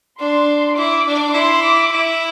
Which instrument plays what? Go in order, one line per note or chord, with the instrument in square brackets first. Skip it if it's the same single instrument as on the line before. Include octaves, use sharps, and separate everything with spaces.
[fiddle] D4 [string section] C6
[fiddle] E4 [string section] D6
[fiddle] D4
[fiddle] E4 [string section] C6
[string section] D6
[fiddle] E4